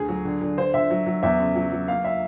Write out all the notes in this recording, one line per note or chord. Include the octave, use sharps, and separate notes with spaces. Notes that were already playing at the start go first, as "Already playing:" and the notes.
Already playing: D2 G#4
F#3
D3
D3
D3 C5
D3 E5
F#3
F#3
E2 E5
C#3
F#3
F#3
A#3 F5
E5